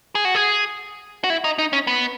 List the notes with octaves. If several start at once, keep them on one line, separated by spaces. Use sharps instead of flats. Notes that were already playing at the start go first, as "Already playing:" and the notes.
G#4
F#4
G#4
F#4
E4
D#4
D#4
C#4
B3